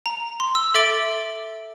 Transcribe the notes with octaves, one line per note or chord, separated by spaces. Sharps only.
A#5
C6
E6
A4 E5 D6 A6 D7 G7